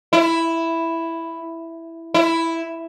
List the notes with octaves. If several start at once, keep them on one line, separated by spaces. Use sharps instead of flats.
E4
E4